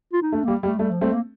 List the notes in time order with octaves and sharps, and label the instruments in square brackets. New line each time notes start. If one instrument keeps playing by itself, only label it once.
[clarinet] F4
D#4
[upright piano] A3 [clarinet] D4
[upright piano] G3 [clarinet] A#3
[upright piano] G3
[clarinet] A3
[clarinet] G3 [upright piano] A3
[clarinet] F3
[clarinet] G3 [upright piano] A3 C4
[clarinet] A#3